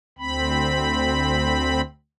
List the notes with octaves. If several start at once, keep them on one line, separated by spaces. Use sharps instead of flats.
D2 C4 B5